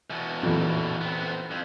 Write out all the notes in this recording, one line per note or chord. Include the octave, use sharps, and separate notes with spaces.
E2 B2
A1 F2 A#2
B3 C4
F2